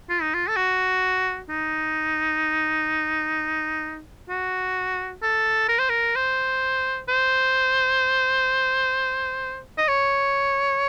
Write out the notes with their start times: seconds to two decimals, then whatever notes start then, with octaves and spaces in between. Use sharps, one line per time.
0.10 F4
0.22 D#4
0.34 F4
0.48 A4
0.56 F#4
1.49 D#4
4.29 F#4
5.22 A4
5.68 A#4
5.79 C5
5.89 A#4
6.16 C5
7.08 C5
9.78 D#5
9.88 C#5